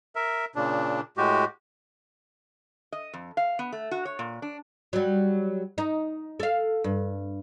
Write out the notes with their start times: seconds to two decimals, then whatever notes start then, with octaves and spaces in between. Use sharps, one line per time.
0.15 A#4 E5
0.55 A#2 C#3 D4
1.17 A2 G#3 F#4 G4
2.92 D#5
3.13 F2
3.37 F5
3.59 B3
3.72 A3
3.91 F#4
4.05 C#5
4.19 A#2
4.42 D4
4.93 F#3 G3
5.78 D#4
6.40 A4 F5
6.84 G2